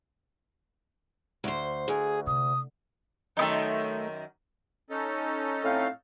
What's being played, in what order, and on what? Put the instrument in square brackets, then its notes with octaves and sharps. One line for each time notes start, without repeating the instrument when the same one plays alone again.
[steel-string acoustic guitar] D2 C5
[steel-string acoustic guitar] D2 [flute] G#4
[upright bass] C3 [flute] D#6
[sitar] F#2 D#3 [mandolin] A3 B3 D#4
[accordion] C#4 D#4 A4
[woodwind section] A2 C4 F5